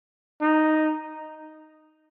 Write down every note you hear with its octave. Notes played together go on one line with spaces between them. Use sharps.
D#4